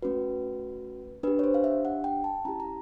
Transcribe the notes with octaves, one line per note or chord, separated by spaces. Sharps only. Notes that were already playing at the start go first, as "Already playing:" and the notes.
A3 C#4 F#4 B4
D4 G4 B4
C#5
C5
F5
E5
F#5
G5
A5
C#4 E4 G4 A#5
A#5